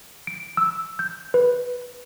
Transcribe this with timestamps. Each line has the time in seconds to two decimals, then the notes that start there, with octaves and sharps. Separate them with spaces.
0.27 D7
0.57 E6
0.99 G6
1.34 B4